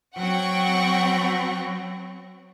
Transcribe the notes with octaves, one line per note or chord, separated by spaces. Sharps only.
F#3 C4 F#5 G5 C#6